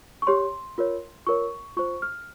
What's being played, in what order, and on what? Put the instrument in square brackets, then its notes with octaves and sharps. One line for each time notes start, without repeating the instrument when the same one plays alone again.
[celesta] C#6
G4 C#5 C6
F4 A#4 C#5
F4 A#4 C#5 C#6
F4 C5 C#6
F6